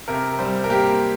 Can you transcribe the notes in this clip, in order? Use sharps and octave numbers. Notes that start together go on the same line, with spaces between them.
C3 A#4
G3 C5
A#4
A#3 G4